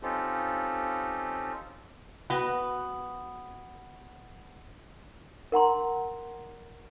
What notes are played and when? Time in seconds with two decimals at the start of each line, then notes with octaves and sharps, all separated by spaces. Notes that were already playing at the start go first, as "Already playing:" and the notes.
0.02 C4 C#4 D#4 F4 G4 A4
2.30 B3 F#4 B4
5.52 A#4 F#5 A#5 C6